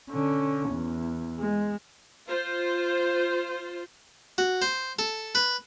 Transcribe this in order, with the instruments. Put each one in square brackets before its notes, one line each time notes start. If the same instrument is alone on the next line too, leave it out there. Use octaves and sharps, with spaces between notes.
[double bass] D3 C#4
E2
G#3
[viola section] F4 C5
[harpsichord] F#4
C5
A4
B4